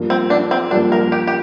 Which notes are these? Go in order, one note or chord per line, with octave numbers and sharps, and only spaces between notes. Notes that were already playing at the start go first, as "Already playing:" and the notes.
Already playing: G2 F3 A#3
C4
D4
C4
G2 F3 A#3 D4
A#4
G4
G4